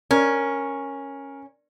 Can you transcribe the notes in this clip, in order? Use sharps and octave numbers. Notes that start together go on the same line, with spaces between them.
C#4 A#4